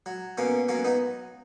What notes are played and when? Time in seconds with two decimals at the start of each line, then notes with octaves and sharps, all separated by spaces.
0.06 F#3
0.38 B2 A#3 C#4
0.69 F#3 A#3 C#4
0.85 B3 D#4